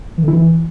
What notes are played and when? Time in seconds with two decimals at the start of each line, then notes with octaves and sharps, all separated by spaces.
0.18 E3
0.23 D3
0.28 E4
0.33 E3